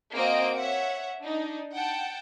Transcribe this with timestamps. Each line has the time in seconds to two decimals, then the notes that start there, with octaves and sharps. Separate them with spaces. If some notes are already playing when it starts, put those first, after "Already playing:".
0.15 A#3 C4 F#4 D#5 D7
0.56 C#5 E5 F#5
1.21 D4 D#4
1.73 F#5 G5 A5